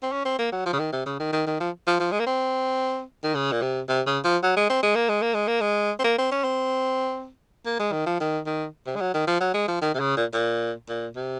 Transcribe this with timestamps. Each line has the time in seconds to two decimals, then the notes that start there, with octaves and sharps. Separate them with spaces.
0.03 C4
0.12 C#4
0.25 C4
0.39 A#3
0.52 F#3
0.66 F3
0.73 C#3
0.79 D#3
0.93 C3
1.06 C#3
1.20 D#3
1.32 D#3
1.47 D#3
1.60 F3
1.87 F3
2.00 F3
2.12 G#3
2.20 A#3
2.27 C4
3.24 D#3
3.35 C#3
3.52 A#2
3.62 C3
3.89 C3
4.06 C#3
4.24 F3
4.43 F#3
4.56 G#3
4.70 C4
4.83 G#3
4.95 A#3
5.09 G#3
5.22 A#3
5.34 G#3
5.48 A#3
5.61 G#3
5.99 C4
6.04 A#3
6.18 C4
6.32 C#4
6.44 C4
7.66 A#3
7.79 G#3
7.92 D#3
8.06 F3
8.20 D#3
8.46 D#3
8.87 C3
8.96 G#3
9.01 F#3
9.14 D#3
9.27 F3
9.41 F#3
9.54 G#3
9.68 F3
9.82 D#3
9.95 C3
10.00 C#3
10.17 A#2
10.33 A#2
10.89 A#2
11.16 C3